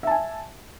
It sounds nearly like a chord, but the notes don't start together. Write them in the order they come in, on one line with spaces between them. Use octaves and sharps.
E5 A5 G#5